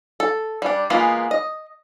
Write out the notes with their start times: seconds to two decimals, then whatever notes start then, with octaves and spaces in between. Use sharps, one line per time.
0.20 A4
0.62 G3 D4
0.90 E3 G#3 A#3 B3 F4
1.31 D#5